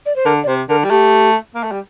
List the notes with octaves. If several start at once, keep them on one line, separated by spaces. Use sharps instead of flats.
D5
C5
D3 A#4
D5
C3 C5
D3 A#4
G3
A3 G4
A#3
A3
G3